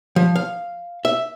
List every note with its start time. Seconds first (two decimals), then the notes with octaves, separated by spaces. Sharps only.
0.16 F3
0.35 F5
1.05 E5